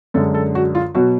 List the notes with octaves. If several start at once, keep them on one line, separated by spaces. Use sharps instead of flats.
F#2 D3 G#3 A4
A4
F#4
F4
B2 F#3 F#4